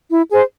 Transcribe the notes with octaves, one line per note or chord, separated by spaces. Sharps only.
E4
G#4 C5